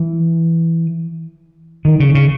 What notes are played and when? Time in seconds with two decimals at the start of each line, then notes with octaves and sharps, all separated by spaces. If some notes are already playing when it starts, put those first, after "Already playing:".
Already playing: E3
1.85 D#3
2.00 C#3
2.15 C#3